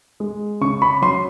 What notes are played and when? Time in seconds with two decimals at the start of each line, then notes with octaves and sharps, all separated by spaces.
0.20 G#3
0.61 C#3 C#6
0.82 B5
1.02 F#3 C6